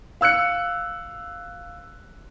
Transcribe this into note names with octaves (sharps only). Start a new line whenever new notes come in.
F5 E6 F#6 C#7